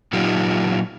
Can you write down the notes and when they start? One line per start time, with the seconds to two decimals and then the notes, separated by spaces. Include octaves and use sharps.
0.13 A#2 F#3 D#4 F4 G4